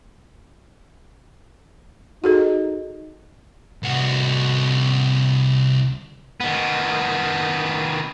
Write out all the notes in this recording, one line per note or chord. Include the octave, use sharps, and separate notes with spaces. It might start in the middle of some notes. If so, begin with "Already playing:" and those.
D#4 F#4 G#4 A4
C2 F#4
D#3 B3